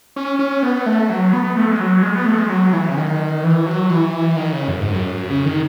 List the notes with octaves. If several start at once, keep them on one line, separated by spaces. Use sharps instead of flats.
C#4
C#4
B3
A3
F#3
B3
A3
G#3
F#3
G#3
B3
A3
G#3
F#3
E3
C#3
D#3
E3
F#3
E3
D#3
C#3
F#2
G#2
F#2
C#3
D#3